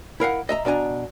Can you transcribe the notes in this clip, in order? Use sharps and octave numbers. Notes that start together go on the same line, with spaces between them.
E4 A#4 F5 F#5
D#5 E5 A#5
B2 D4 B4 G#5 A#5